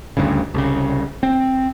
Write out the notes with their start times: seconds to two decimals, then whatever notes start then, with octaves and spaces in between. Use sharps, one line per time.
0.17 D2 G2 C#3
0.54 C2 C#3
1.23 C4